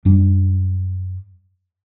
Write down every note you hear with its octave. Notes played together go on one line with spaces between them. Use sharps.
F#2 G3 D4